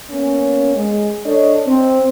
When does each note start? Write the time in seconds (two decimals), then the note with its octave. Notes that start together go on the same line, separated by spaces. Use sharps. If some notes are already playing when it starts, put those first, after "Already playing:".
0.11 A#3 B3 C#4
0.75 G#3
1.26 D4 A4 C#5 D#5
1.67 C4